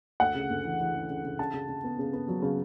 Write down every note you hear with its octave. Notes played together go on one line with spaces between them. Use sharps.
D2 F#5
C#3
D2
E3
E3
C#3
C#3
C#3
C#3 A5
C#3
C#3
B3
C#3
B3
F#3
C#3